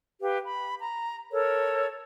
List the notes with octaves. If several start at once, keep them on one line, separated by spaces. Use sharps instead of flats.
G4 B4 F5
B5
A#5
A4 A#4 C#5